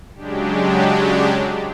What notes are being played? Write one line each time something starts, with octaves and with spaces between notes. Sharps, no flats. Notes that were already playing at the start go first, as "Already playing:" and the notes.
C#3 F#3 G#3 D4 G4